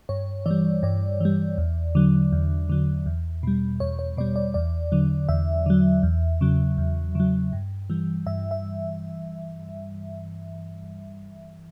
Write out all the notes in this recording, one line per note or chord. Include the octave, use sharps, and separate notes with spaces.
G2 C#5
E3 G3 D5
G2 D5
E3 G3
E2
D3 F#3
E2
D3 F#3
E2
B2 G3
E2 C#5
C#5
B2 G3 D5
D5
E2 D5
D3 F#3
E2 E5
D3 F#3
E2
C#3 F#3
E2
C#3 F#3
G2
E3 G3
G2 E5
E5